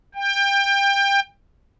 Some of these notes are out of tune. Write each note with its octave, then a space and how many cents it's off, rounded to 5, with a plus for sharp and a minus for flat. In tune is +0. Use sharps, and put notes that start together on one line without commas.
G5 +25